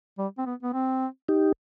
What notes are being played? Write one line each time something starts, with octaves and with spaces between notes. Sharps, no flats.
G3
C4
B3
B3
C4
D#4 G4